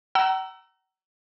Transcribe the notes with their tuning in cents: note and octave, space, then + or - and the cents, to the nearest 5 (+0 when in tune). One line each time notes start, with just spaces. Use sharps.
F#5 +45 A#5 +0 E6 +10